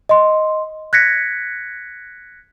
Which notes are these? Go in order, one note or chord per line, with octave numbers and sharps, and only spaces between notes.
D#5 C6
F#6 G#6 A#6 B6 C#7